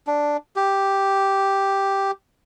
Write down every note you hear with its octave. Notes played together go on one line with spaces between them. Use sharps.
D4
G4